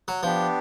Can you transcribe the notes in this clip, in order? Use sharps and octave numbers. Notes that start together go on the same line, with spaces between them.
F#3
F3 B3 D4 G4